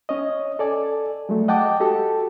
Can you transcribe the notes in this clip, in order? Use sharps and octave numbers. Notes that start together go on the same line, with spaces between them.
C#4 C#5 D#5
A4 D5 G#5
F#3 G#3 A3
D#5 F#5 G5 A5 D6
F#4 G4 A4 A5